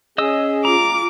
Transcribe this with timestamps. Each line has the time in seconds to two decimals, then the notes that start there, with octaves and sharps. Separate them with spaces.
0.18 C#4 G#4 D#5 D#6 E6
0.65 F4 A#5 D6